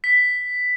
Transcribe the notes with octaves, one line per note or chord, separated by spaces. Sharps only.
B6